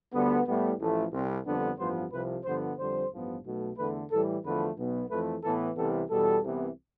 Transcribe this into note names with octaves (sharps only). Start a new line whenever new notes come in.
D2 D3 G3 B3
A2 G3 B3
A1 A2 F3 A3
C2 C3 G3 C4
F2 D3 G3 B3 D4
A1 G2 F3 B3 C5
C2 C3 F3 B4
G2 D3 F3 B3 C5
F2 D3 G3 C5
A1 G2 F3 B3
B1 B2 A3
E2 D3 A3 B4
A2 E3 G3 A4
E2 D3 F3 A3 B4
B1 B2 B3
F2 E3 A3 B4
A2 E3 B3 A4
C2 C3 E3 G3 B3 A4
E2 B2 G3 A4
C2 C3 E3 B3